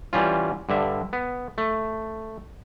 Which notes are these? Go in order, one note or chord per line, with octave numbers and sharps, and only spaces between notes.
E3 G3 C#4 F4
G2 D3 E5
B3
A3